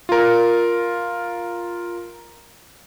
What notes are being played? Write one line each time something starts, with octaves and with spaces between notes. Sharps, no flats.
F4 A#4